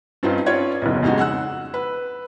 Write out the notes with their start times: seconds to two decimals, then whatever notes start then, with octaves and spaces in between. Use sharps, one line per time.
0.23 G2 C4 C#4 D#4 F4
0.46 C#4 F4 C#5 D5 G#6
0.82 F#1 B1
1.03 F2 C#3 G#3 D#4 F#4
1.19 F#5 E6 F#6
1.74 B4